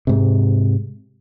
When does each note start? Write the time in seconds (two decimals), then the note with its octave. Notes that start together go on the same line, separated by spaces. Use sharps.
0.07 G#2 C3